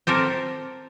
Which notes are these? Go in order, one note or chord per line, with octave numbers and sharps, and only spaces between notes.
C4 G4 A4 A#4